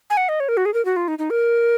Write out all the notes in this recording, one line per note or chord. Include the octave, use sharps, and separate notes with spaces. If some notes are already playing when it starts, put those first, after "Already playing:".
G#5
F#5
D#5
C#5
A#4
F#4
G#4
A#4
F#4
F4
D#4
D#4
A#4